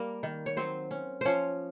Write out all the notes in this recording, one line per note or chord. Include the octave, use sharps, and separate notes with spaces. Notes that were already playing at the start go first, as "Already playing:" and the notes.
Already playing: G3 A#3 A#4
D#3
C#5
F#3 C4 C5
C#4
F3 C#4 C5 C#5